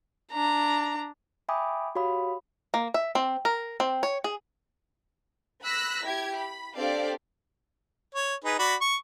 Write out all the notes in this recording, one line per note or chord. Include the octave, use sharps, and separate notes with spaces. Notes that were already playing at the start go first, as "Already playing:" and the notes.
D4 A#5
E5 G5 G#5 B5 D6 D#6
F#4 G4 C#5 F5 B5 D#6
A#3
E5
C4
A#4
C4
C#5
G#4
B5 E6 F#6 A#6 B6
E4 G4 G#6
B5
C4 D4 G4 A4 D5 F5
C#5
D#4 G#4 B4
F#4 D5 B5
C#6